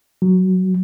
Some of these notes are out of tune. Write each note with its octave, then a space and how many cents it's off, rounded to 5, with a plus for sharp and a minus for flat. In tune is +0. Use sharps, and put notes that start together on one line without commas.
F#3 +10